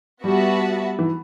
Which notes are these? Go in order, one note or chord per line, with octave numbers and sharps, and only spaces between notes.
G3 B3 F#4 B4 E5 A5
E3